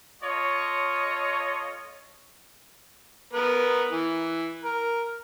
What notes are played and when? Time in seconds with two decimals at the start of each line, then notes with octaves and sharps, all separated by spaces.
0.22 F4 A4 C#5 D#5
3.33 B3 A#4 B4
3.92 E3
4.64 A#4